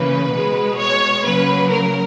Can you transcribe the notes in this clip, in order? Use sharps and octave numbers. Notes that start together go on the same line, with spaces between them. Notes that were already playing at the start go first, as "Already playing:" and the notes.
Already playing: C#3 E3 A#3 B4
B2 G#3
C#5
C#3 F#3 A#3 B4
A#4